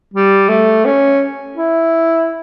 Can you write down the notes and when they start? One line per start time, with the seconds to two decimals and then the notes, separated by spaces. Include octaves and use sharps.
0.14 G3
0.49 A3
0.85 C#4
1.57 E4